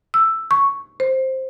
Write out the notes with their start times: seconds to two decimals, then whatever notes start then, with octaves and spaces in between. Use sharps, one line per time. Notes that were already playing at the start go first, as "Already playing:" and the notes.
0.14 E6
0.51 C#6
1.00 C5